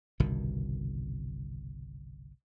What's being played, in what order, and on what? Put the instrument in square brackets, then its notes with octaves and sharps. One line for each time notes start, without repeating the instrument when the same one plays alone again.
[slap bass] G1 C2 B2 D#3